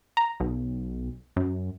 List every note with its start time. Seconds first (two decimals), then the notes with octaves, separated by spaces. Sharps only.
0.17 A#5
0.40 B1
1.36 F#2